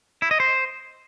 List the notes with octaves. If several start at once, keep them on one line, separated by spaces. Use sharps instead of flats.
E4
D#5
C5